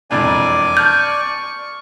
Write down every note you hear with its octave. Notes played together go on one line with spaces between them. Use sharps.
E1 F2 D4 D5 G#5
A5 C#6 F6 G6